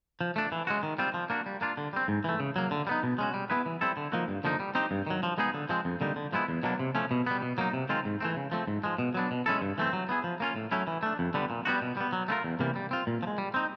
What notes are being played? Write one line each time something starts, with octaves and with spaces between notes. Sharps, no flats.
F3
A3 D4
E3
G#3 C#4 F#4
D#3
G3 C4 F4
F3
A#3 D4 F#4
G3
A#3 D4 F4
D3
G3 C4
G#2
E3 A3
C#3
F#3 A#3
D3
G3 B3 D#4
B2
G#3 C#4 F#4
G3
B3 E4 G#4 B4
E3
G3 C4 E4 A4
D3
F3 A#3 D#4 F#4
G2
D3 F3 A#3 D#4
G3
C4 D#4 G4
G2
D#3 F#3
F3
G#3 B3 D#4 G#4
D3
F3 G#3 C4
F2
D3 G3 A#3 D#4
D3
F3 G#3 B3 E4
E2
B2 F#3 A#3 D4
C3
F3 A3 C#4
B2
G3 B3
B2
F#3 A#3 D#4
C3
D#3 G#3 C4 F4
G#2
E3 A3 C4
C#3
F3 A3 C4
G#2
F3 G#3
B2
F#3 B3 D4
B2
G#3 C#4 E4 A4
G2
E3 A3 C4
F#3
B3 E4 G#4
F3
A#3 C#4 F4
A2
F#3 A3 C#4 E4
E3
A3 D4
F2
D3 G3 B3
A#2
G3 B3 D#4 F#4
B2
G3 B3
F#3
A3 C4 F4 A#4
E2
C3 E3 G3 A#3
G3
C4 F4
A#2
F3
G#3
G3
C4 D#4